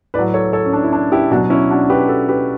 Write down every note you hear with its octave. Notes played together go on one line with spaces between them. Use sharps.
A2 F#3 B4 D5
A4 C#5
A4 C#5
C#4
D4
E4
D4
E4 G4
B2 F#3 D4 F#4
C#4 E4
D4 F#4
G4 B4
F#4 A4
G4 B4